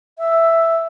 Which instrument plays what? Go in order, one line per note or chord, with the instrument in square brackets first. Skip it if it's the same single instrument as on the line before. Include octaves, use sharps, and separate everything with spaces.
[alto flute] E5